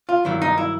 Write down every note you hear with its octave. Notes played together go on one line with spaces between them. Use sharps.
F4
G2 D#3 F#3 E4
D#4
E4